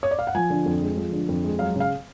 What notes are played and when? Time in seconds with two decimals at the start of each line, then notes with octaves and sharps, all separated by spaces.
0.03 C#5
0.11 D5
0.19 F5
0.27 F#5
0.35 F3 G#5
0.50 D3
0.66 F2
0.81 G#3
0.97 F3
1.12 D3
1.29 F2
1.44 G#3
1.59 F#3 F5
1.76 C#3 F5